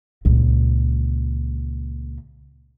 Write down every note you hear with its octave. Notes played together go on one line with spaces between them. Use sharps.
C#2 A#2